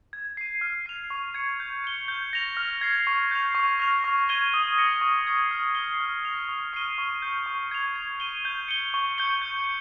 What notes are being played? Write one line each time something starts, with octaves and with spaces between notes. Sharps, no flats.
G#6
C7 D#7
F6
C7 F7
C#6
G#6 C#7
G6
C#7 G7
G6
A#6 F7
F6
G#6 C7
C#6
G6 C7 F7
C#6
F6 A#6 F7
C#6
G#6 D#7 G7
D#6
A#6 C#7 G7
C#6
G#6 C7
F6
C7 G7
F6
A#6 F7
C#6
F6 C7 D#7 G7
C#6
G6 C#7
C#6
G#6 C7 F7
G#6
D#7 G7
G6
C#7 G7
C#6
G6 C#7 G7
G6